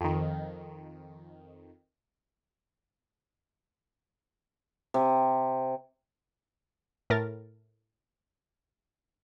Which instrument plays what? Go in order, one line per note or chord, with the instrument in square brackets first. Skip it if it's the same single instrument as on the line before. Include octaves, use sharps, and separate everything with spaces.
[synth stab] F2 D#3
[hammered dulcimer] C3
[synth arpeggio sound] A2 A#4 A6